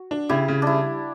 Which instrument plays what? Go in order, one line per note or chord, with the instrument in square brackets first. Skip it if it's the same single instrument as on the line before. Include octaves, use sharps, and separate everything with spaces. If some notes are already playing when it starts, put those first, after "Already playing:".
Already playing: [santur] F#4
[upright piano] D4
[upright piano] C#3 [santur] E4 G4
[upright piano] C#3
[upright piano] G3 [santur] D4 E4